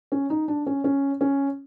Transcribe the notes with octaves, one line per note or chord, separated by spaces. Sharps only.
C#4
D#4
D4
C#4
C#4
C#4